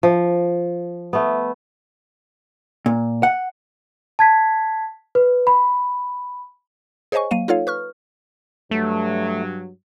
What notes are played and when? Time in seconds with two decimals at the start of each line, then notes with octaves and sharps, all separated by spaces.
0.03 F3
1.13 A3 B3
2.86 A#2
3.23 F#5
4.19 A5 G#6 B6
5.15 B4
5.47 B5
7.12 G#4 C5 C#5 D#5 G#5 C#6
7.31 F#3 A#3 F5 D#7
7.48 D#4 F4 A4 C#5 F5
7.67 B4 C#6 F6
8.71 G2 F#3 A3